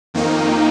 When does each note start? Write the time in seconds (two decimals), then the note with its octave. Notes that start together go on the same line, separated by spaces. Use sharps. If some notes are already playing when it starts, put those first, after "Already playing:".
0.14 F2 D#3 A#3 D#4